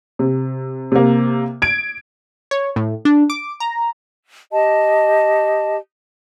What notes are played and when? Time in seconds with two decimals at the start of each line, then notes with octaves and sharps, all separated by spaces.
0.19 C3
0.92 C3 A#3
1.62 G#6 D7
2.51 C#5
2.76 A2
3.05 D4
3.30 D6
3.60 A#5
4.53 G4 D#5 A5